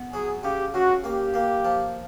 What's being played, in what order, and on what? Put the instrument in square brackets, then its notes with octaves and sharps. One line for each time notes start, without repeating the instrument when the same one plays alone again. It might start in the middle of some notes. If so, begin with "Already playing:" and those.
Already playing: [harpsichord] B3
[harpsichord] F#3 [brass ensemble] G#4
[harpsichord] C#3 [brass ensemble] G4
[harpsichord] C#3 [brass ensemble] F#4
[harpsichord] A#3 [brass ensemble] G4
[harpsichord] A#3
F3